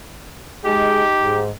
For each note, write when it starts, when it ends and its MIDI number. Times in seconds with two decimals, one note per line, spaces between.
0.65 1.02 56
0.65 1.43 63
0.65 1.43 67
0.65 1.02 68
1.22 1.51 44